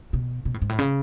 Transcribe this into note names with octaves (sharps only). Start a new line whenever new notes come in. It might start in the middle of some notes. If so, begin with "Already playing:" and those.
B2
B2
A2
G#2
A2
C#3